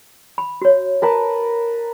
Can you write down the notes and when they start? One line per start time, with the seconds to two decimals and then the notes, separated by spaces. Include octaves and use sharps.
0.38 B5
0.62 F#4 C#5
1.02 A#4 B4 A5